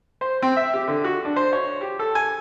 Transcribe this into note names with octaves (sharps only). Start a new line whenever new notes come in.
C5
C4
E5
G4
D3
F#4
D4
C5
C#5
G4
A4
G#5